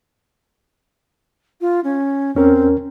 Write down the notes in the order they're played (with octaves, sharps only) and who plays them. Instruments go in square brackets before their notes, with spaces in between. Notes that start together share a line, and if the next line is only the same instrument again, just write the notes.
[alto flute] F4
C#4
[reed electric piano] E2 C#4 A#4 [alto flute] C4